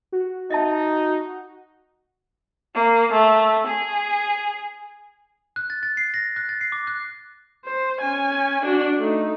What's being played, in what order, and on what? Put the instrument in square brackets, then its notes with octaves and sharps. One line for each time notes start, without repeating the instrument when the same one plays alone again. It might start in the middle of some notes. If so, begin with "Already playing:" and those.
[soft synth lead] F#4
[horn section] D#4 [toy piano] D#5 E5 A5
[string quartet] A#3
A3
G#4
[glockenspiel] F#6
A6
A6
C7
A#6
F#6
A6
C7
D6
F#6
[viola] C5
C#4 G#5
D4 F#4
A3 D#4